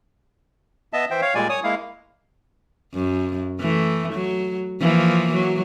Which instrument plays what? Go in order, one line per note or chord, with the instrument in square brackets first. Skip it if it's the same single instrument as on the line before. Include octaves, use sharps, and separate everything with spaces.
[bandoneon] B3 D#5 E5 A5
E3 C5 E5 G5
C#5 F5
A#2 G3 G#3 D5 G#5
C#5 G#5 D#6
G#3 A#3 E4 F5
[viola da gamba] F#2
E3 A3
F#3
E3 F3 A#3
F#3